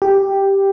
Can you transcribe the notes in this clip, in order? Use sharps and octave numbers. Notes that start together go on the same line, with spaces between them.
G4